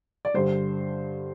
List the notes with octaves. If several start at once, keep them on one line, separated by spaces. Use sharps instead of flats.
D5
G2 D3 G3 C5